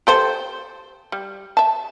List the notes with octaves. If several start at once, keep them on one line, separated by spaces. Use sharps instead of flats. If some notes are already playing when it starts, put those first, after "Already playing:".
G4 A4 C5
G3
E5 A5